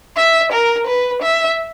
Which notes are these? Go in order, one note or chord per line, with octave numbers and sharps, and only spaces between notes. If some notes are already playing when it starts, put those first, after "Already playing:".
E5
A#4
B4
E5